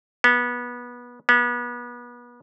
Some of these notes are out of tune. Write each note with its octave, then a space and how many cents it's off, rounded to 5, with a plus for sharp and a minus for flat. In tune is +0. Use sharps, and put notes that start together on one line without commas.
B3 -20
B3 -30